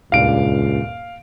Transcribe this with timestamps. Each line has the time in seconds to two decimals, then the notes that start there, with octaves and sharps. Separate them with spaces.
0.12 D#1 C#2 G2 A#2 F5 D7